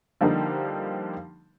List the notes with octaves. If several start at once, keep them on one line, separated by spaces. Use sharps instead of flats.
D3 F3 G3 A#3 D#4